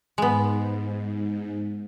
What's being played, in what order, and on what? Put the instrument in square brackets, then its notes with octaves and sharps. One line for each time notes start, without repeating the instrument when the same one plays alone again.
[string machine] G#2 [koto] G#3 B3